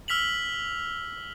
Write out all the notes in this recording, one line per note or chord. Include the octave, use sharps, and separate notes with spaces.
E6 F6 B6 F7 F#7